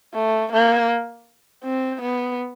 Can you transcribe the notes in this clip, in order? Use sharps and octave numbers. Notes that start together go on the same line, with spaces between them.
A3
A#3
C4
B3